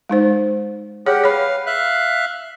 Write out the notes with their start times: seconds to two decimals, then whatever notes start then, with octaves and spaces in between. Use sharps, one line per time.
0.09 G#3 D#4 C5
1.06 G4 G#4 C#5 F#5
1.24 B4 C#5 F5 B5
1.66 E5 F5 F#6